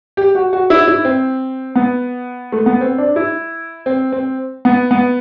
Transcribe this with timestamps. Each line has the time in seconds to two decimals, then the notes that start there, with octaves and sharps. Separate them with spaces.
0.17 G4
0.35 F#4
0.53 F#4
0.70 E4
0.88 E4
1.05 C4
1.76 B3
2.52 A3
2.66 B3
2.81 C4
2.98 D4
3.16 E4
3.86 C4
4.12 C4
4.65 B3
4.91 B3